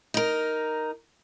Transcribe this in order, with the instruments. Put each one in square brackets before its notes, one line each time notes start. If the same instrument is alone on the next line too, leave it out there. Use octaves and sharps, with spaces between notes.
[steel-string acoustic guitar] D#4 A#4